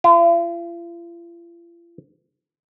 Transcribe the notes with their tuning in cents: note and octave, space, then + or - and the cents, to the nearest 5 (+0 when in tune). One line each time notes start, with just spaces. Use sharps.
F4 -45